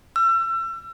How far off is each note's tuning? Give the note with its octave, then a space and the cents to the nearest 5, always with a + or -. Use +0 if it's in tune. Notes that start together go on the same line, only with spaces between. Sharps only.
E6 +35